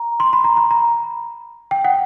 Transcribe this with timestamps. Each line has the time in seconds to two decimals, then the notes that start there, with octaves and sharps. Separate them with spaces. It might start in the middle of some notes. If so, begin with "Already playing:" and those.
Already playing: A#5
0.20 C6
0.33 B5
0.44 A#5
0.57 B5
0.71 A#5
1.71 G5
1.85 F#5